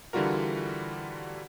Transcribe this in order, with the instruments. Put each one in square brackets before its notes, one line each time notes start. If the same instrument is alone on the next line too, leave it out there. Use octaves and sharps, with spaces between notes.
[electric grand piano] D3 E3 G3 F4 F#4 A#4